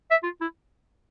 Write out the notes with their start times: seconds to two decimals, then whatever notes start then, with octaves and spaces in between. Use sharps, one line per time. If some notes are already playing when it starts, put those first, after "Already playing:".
0.11 E5
0.23 F4
0.41 E4